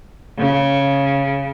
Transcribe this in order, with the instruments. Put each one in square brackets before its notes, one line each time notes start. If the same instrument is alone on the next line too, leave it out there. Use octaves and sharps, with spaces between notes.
[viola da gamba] C#3